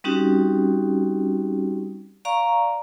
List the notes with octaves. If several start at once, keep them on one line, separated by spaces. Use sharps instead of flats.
G3 C4 C#4 D#4 F#4 G4
D5 F5 A#5 C#6